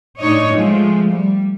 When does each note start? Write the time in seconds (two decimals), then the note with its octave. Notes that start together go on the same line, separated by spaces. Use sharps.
0.17 A2 D4 D#4 C#5 D#5
0.51 F3 G#3 A3
1.09 G3